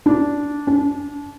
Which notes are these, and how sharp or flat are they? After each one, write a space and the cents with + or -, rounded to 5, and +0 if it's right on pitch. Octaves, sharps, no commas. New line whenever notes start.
D4 -15
D4 -30